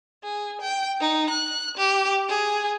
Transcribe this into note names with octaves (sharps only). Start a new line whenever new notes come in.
G#4
G5
D#4
F#6
G4
G#4